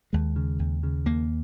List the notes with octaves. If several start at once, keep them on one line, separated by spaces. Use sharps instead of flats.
D#2 G#3
C#3
D#2
C#3
D#2 A#3